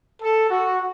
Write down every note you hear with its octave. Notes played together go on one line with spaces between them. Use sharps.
A4
F#4